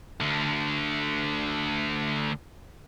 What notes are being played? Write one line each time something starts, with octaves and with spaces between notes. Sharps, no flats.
D2 D3